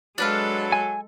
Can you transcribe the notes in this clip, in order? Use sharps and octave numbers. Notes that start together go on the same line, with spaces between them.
F#3 G#3 D4 A4 B4 F5
G#5